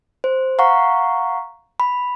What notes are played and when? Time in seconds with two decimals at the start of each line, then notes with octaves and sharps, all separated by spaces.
0.24 C5
0.59 F5 F#5 A#5 C#6
1.80 B5